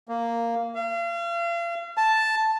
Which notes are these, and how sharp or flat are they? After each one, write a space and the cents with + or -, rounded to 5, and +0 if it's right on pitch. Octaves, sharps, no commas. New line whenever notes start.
A#3 -5
F5 -40
A5 +0